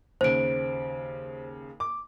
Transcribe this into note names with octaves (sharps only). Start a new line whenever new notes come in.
D#2 C#3 C5 D7
D6